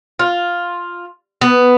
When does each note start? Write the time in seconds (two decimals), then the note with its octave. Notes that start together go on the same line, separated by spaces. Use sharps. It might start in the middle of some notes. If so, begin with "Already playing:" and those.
0.19 F4
1.41 B3